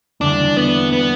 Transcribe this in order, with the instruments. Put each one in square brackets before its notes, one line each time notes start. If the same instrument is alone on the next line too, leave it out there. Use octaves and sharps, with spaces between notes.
[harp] E2 D3 G3 [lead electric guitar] D4
[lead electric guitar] B3
B3